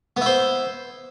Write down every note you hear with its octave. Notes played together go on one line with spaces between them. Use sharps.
B3 E4 C5